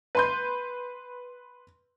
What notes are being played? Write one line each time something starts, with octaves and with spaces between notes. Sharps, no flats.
B4 C6 G6